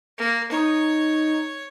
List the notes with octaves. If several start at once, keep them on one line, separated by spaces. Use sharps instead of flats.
A#3
D#4 C#5